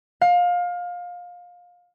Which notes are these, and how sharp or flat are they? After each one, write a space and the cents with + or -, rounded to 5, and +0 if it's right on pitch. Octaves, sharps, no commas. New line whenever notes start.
F5 +25